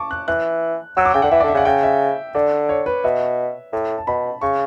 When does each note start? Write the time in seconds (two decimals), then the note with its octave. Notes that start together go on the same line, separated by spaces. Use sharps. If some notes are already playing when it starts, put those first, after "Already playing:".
Already playing: A5 C#6 D6
0.11 F#6
0.28 E3 F#6
0.97 F#3 E6
1.05 D6
1.14 C#3 G5
1.22 D3 F#5
1.31 E3 E5
1.40 D5
1.43 D3
1.48 E5
1.54 C#3
1.57 F#5
1.65 C#3 G5
1.83 E5
2.35 D3 D5
2.69 C#5
2.86 B4
3.04 B2 E5
3.73 A2
3.98 A5
4.07 B2 B5
4.41 C#3 C#6